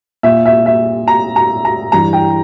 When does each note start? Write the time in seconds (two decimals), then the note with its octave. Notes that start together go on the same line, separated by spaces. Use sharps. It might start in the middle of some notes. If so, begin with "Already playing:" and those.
0.23 A#2 E5
0.46 E5
0.66 E5
1.08 A#5
1.36 A#5
1.65 A#5
1.92 G2 E3 A#5
2.13 G5